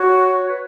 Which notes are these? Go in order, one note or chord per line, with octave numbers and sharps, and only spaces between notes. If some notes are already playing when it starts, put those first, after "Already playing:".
Already playing: F#4 C#5
B4